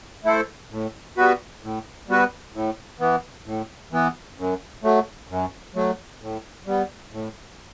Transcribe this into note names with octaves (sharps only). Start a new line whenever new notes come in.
A3 E4 A4 C5
A2
G3 B3 F#4 B4
A2
G3 B3 F#4 B4
A2
E3 B3
A2
E3 B3
F#2
F#3 A3
F#2
F#3 A3
A2
G3 B3
A2